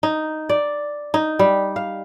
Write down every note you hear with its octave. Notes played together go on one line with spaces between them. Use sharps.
D#4
D5
D#4
G3
F5